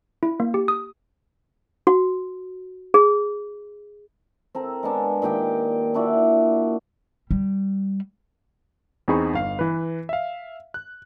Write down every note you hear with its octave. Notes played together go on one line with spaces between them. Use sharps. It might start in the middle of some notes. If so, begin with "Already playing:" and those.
E4
A#3
G4
D#6
F#4
G#4
C4 A4 A#4
G#3 B3 D4
A#2 D#3 G4 G5
D4 E4 F#4 D5
G3
E2 C4 D#4 G#4 B5 C#6
G1 F5 C7
E3 B4
E5 F5
F#6